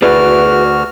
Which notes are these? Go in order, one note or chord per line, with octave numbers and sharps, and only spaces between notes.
D2 F#4 G#4 B4 D5 F6